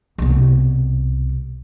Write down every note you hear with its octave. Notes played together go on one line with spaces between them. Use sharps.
C2 B2